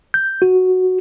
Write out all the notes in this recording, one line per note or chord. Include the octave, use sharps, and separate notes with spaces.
G6
F#4